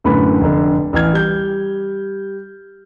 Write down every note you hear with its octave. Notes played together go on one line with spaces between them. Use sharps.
F#2 A2 D3 B4 B5
F1 D3
A1 E3 F6 G#6
G3 G6